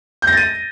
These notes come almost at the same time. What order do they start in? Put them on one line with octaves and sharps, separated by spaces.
G6 A#6 A6 D#7